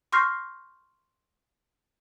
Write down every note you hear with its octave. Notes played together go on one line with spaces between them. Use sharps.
C6 C#6 F6 G6 A#6 C7